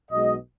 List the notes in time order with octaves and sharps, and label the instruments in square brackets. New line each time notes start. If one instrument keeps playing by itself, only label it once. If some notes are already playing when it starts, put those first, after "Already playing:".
[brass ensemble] B1 B2 G#3 D#5